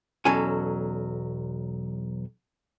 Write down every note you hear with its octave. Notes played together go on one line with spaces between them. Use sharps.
B1 E2 F#3 C#4 A4 G#5